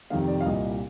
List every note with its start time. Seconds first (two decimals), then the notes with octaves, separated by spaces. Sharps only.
0.10 F2 C3 D#3 G3 F5
0.28 D5
0.40 F5
0.45 C2 A#2 G3 D#5